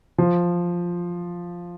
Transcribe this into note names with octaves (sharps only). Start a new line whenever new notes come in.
F3